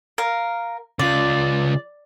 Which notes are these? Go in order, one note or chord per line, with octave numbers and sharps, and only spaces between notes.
A#4 F5
C#3 F4 D5